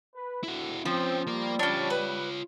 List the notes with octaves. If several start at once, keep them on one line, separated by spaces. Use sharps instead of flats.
B4
D2 E4 F#4
F3 C4 C#4 C5
G3 A#3 A#4
C#4 D4 F4 C#5
B4